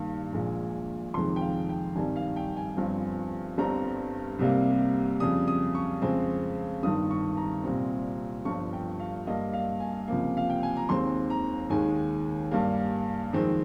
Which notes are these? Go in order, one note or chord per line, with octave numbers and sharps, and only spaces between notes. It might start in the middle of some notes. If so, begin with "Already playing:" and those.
Already playing: G2 D#3 A#3
A#1 A#2 G#3
F1 F2 D#3 G#3 C6
G5
F5
G5
G#1 G2 D#3 G3 G#5
F5
G5
G#5
G1 G2 F3 C4
G1 G2 G3 C4 A#5
C2 C3 G3 A#3
F2 C#3 G3 D#6
D#6
C#6
F2 C#3 G#3 C4
G1 G2 D#3 D#6
C#6
A#5
C2 A#2 G3 C4
G1 G2 F3 C#6
G5
F5
G2 G3 A#3 D#5
F5
G#5
C#2 C3 F3 A#3
F5
G5
G#5
A#5
D#2 D#3 G#3 C4 C6
A#5
D#2 D#3 G#3 G#5
G2 G3 A#3
F2 D#3 G#3 C4